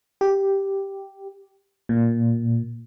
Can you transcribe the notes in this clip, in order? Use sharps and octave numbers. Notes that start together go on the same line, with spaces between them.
G4
A#2